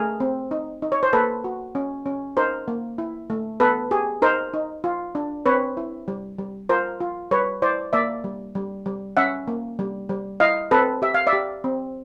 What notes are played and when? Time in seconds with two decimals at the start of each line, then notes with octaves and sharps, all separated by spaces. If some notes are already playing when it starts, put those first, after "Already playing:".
Already playing: A3 G#4 A#4
0.20 C4
0.51 D#4
0.82 D#4
0.92 C#5
1.03 C5
1.13 A#3 A4 B4
1.44 F#4
1.75 C#4
2.06 C#4
2.37 D#4 A#4 C5
2.68 A#3
2.98 E4
3.30 A3
3.60 B3 A4 B4
3.91 G4 G#4
4.22 D#4 A#4 C5
4.53 D#4
4.84 F4
5.15 D4
5.46 C4 B4 C#5
5.77 E4
6.08 G3
6.38 G3
6.69 F4 A#4 C5
7.00 F4
7.31 G3 B4 C#5
7.62 E4 C5 D5
7.93 A#3 D5 E5
8.24 G3
8.55 G3
8.86 G3
9.17 C#4 E5 F#5
9.48 A#3
9.79 G3
10.09 G3
10.40 E4 D#5 F5
10.71 C4 A4 B4
11.02 G4 E5
11.14 F5
11.27 D5 E5
11.33 G4
11.64 C4